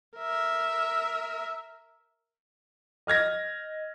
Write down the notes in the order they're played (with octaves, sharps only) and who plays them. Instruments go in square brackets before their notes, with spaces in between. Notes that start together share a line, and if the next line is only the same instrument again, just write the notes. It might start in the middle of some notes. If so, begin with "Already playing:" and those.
[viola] A#4 E5
[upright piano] D#5 F6 G#6 A#6